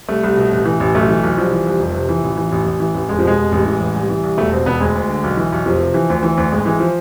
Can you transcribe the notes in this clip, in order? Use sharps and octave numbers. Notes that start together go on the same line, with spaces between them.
C2 A3
C2
B2
A1
E3
A1
B1 A3
E3
B1
C2 F3
E3
C2
F1
C3
E3
A1
E3
A1
A1
E3
A1
F1 G#3
F3
B2 G#3
F1
A1
E3
A1
C2
E3
C2
E1 A3
B2 C4
E1 B3
D2 G#3
D2
D3
B1
E3
B1
F1 F3
C3
E3
D2
E3
D2
G#1 G#3
E3 G#3
F3